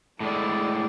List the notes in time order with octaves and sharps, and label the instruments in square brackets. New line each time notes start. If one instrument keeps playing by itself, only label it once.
[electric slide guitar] A2 G#3 [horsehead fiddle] A4 D5